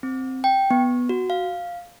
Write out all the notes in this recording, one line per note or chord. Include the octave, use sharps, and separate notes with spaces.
C4
G5
B3
F#4
F5